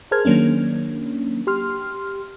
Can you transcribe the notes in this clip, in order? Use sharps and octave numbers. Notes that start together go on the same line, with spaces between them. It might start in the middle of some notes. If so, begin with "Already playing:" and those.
G#4 A#4 C5 A5 F6 G#6
D#3 F#3 A#3 C#4 D4
G4 C6 F6